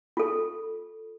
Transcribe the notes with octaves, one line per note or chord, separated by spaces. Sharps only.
F4 A4